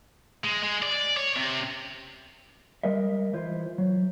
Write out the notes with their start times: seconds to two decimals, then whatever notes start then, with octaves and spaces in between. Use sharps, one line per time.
0.45 G#3
0.63 G#3
0.82 D5
1.17 C#5
1.36 C3
2.83 G3 G#3 A#4 D#5 E5
3.33 E3 E4 F4 C5
3.78 F#3